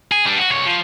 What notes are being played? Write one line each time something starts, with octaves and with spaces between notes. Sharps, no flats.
G#4
G3 D4
F#4
C2 C#5
F3